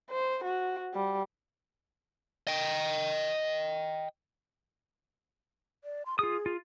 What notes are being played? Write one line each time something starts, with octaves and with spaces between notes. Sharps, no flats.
C5
F#4
G3
D#5 G5
D5
C6
F4 G#4 D#6
F4